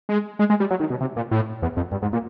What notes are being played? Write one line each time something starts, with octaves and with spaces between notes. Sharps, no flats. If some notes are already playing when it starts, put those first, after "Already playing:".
G#3
G#3
G#3
G3
F#3
D#3
B2
C3
A#2
A2
E2
F2
G2
G#2
A#2